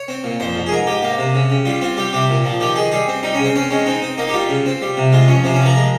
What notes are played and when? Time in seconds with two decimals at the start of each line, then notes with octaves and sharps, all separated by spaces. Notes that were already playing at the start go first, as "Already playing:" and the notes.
Already playing: C#5
0.08 C4
0.24 A#2
0.40 F2 C5
0.55 F2
0.66 G#4
0.71 G#2 A#4
0.87 G#2 G4
1.02 A#3
1.18 C3
1.35 C#3
1.50 C#3
1.65 G3 F4
1.81 C4 F4
1.97 G3 G4
2.13 C3 G4
2.30 A#2
2.45 F3
2.60 D#3 G4
2.76 D#3 G#4
2.92 G3 G#4
3.08 C4
3.23 G3 D#4
3.34 C#4
3.39 C#3
3.45 C4
3.56 C4 C#4
3.71 G#3 C#4
3.86 C4 D#4
4.02 C4
4.18 A#3 D#4
4.29 G4
4.33 G3 F4
4.49 C#3
4.66 C4
4.82 G3
4.97 C3
5.12 G#3 F4
5.28 F2 C#4
5.44 C3 C4
5.54 C#4
5.60 F3
5.66 A#4
5.76 G#3